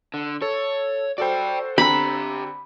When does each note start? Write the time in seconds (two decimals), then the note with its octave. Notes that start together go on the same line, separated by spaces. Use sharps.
0.14 D3
0.42 A4 C#5
1.18 F#4 A4 C5 D5 G5
1.78 D3 C4 G4 A#5 B5